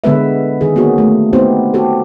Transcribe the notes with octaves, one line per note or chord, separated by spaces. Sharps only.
D3 G#3 B3 B4 E5
D#3 G#4
A#3 B3 C#4 F#4 G#4
A3
B3 C4 D#4 F#4 G4 C5
F#4 G4 A4